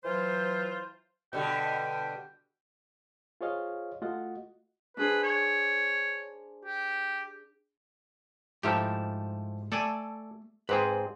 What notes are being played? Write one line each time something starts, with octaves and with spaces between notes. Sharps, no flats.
E3 F#3 F4 C5
B2 D3 G3 G5
F4 G#4 C5 C#5 D#5 F5
A3 F4 F#4 D#5 F#5
D4 G#4 B4 C5
C#5
G4
G#2 F3 A3 E4 G4 A#5
A3 A4 D5 G#5
G#2 C4 G#4 B4